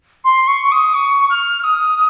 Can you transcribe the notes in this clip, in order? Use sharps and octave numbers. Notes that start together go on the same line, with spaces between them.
C6
C#6
D#6
C#6
F6
D#6